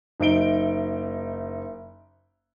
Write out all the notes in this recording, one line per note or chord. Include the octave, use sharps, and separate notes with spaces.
F#1 D#4 E5 D7 G7